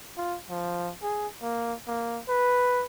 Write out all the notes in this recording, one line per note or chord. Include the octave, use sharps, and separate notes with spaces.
F4
F3
G#4
A#3
A#3
B4